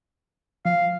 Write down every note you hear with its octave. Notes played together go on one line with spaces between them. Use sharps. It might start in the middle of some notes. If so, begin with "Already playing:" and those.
F3 F5